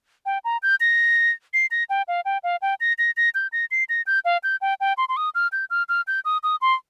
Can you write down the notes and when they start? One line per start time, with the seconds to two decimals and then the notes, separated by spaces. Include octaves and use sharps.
0.26 G5
0.45 A#5
0.63 G6
0.80 A#6
1.54 C7
1.71 A#6
1.90 G5
2.08 F5
2.25 G5
2.44 F5
2.62 G5
2.80 A#6
2.98 A#6
3.17 A#6
3.35 G6
3.52 A#6
3.71 C7
3.89 A#6
4.07 G6
4.25 F5
4.43 G6
4.61 G5
4.80 G5
4.98 C6
5.09 C6
5.17 D#6
5.35 F6
5.52 G6
5.70 F6
5.89 F6
6.07 G6
6.25 D#6
6.43 D#6
6.61 C6